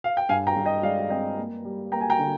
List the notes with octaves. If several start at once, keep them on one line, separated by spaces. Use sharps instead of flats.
F5
G5
G2 F5 G#5
G5 A#5
G2
D#5 G5
G#3 D5 F5
F5
C4 D#5 G5
A#3
G3
A#3 G5 A#5
G#5
G5 A#5
D3